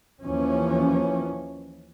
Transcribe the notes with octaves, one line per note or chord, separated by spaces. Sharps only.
D#2 E3 F3 C#4